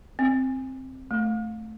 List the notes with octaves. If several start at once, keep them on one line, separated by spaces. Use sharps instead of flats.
C4
A3